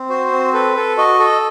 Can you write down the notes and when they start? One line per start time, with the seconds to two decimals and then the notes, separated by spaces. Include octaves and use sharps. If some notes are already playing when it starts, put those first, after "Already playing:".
Already playing: C4
0.10 F#4 C5
0.32 C4
0.53 A4 B4
0.76 A4
0.98 F#4 D#5
1.20 A4